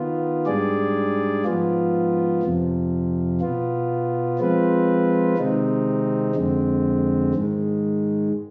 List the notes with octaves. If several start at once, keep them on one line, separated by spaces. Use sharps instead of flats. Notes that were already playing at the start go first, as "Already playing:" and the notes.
Already playing: D#3 B3 F4
G#2 G3 D4 G#4 D5
G#2 F3 B3 F4
F2 C3 F3
B2 B3 F4
F3 G#3 C4 F4 B4
C3 D#3 G#3 C4 D#4
F2 D3 G#3 C4
G#2 D#3 G#3